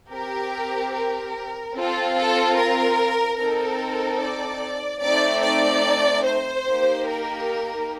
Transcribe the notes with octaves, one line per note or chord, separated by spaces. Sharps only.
C4 G4 A#4
A#4
C4 F4 A4
A4
A#4
C4 D#4 A4 A#4
D5
A3 C4 D#4 D5
D5
C5
A#3 D#4 G4
A#4